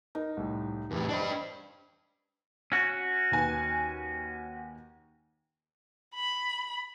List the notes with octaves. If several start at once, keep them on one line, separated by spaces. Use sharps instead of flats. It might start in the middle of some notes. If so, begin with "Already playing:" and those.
D#4 A#4
C2 A2
F2 A2 E3 G4
D4 B4 C5 D#5 A5
C#4 F#4
D#2 B4 G#5
B5